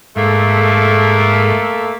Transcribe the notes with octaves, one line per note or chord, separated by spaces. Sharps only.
G#2 A3 A#3